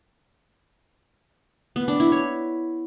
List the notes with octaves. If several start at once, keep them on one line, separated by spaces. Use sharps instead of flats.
B3
D4
E4
C#5